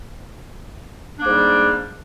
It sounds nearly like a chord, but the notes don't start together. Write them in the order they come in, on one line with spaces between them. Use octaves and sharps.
D4 A#3 G#2 G3